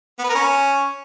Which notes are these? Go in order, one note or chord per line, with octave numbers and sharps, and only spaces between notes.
B3
B4
A#4
C#4